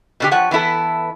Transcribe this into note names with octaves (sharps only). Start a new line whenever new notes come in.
B2 D3 G4
F3 C#5 F#5
E3 B3 E4 A4